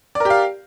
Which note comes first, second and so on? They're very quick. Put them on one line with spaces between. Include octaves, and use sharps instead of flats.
D5 A#4 G4 F5